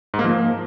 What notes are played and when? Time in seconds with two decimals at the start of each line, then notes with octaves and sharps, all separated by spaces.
0.14 G#2
0.19 A#3
0.24 F3
0.29 A#3